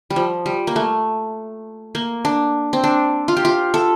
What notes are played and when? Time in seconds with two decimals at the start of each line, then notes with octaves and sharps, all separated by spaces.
0.10 G3
0.16 F3
0.46 G3
0.67 A#3
0.76 A3
1.95 A#3
2.25 D4
2.73 C4
2.84 D4
3.28 F4
3.37 G4
3.45 F4
3.74 A4